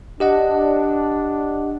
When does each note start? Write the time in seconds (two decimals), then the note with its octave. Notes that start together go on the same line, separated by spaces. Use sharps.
0.20 D4 G4 D#5 F#5